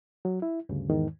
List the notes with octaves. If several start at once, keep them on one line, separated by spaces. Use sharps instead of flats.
F#3
E4
D2 G2 C#3
E2 G#2 D#3